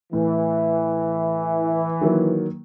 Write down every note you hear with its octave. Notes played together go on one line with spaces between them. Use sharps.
A2 E3
D#3 F#3 A#3